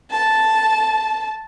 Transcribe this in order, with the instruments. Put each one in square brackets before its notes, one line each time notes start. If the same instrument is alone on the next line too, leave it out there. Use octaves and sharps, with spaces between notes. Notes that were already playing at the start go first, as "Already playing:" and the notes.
[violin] A5